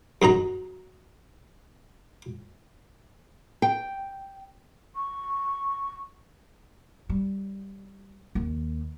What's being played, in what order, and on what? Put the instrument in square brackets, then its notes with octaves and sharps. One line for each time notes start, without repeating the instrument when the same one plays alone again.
[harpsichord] F#2 F#3 D#4 A#5
[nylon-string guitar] G5
[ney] C#6
[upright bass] G3
D#2 D#3